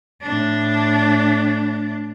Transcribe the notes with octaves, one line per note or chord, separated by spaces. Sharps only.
A2 D4